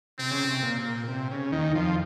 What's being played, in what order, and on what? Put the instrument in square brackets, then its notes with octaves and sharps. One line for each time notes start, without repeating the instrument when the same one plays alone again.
[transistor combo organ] C3 [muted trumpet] C4
[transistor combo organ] C#3
C3
A#2
C3
C#3
D#2 D#3
F2 F3